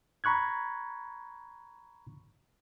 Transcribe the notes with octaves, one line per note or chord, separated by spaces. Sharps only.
A#5 B5 C#6 F#6 G#6